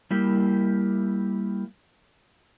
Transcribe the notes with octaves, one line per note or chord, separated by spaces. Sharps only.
G3 A#3 E4 G4